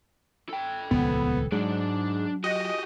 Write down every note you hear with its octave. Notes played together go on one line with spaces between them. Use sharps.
A4 G5
D#1 C#2 F3 B3
G#2 F#3 D4 D5
F#4 G4 D#5